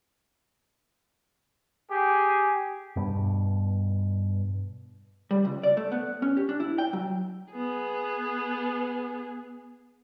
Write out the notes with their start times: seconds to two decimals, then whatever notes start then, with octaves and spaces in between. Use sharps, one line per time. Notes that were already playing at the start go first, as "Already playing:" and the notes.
1.91 G4 G#4
2.96 G2 B2
5.31 G3
5.45 C#2
5.63 D5
5.77 A3
5.92 B3
6.22 C#4
6.37 G4
6.49 D4
6.60 E4
6.78 G5
6.93 F#3
7.52 B3 G#4